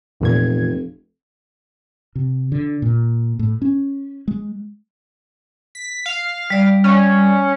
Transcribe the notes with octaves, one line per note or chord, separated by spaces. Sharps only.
F1 E2 A#2 G#6
C3
D3
A#2
A2
C#4
G#3
B6
F5
G3 D5
C#4